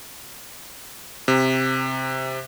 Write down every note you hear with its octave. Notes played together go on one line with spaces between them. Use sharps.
C3